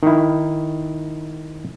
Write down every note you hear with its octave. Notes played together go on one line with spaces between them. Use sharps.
D#3 E4